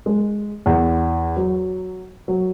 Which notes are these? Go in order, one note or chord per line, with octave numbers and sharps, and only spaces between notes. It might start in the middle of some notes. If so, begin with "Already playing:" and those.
G#3
E2
F#3
F#3